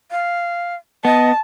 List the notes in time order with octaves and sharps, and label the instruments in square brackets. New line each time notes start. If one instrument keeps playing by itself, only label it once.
[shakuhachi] F5
[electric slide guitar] B3 [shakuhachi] D#5 [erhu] A5